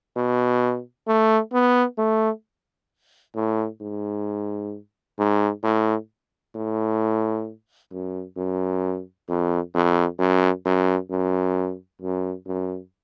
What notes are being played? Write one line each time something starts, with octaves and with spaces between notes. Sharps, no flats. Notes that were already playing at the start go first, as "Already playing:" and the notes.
B2
A3
B3
A3
A2
G#2
G#2
A2
A2
F#2
F#2
F2
F2
F#2
F#2
F#2
F#2
F#2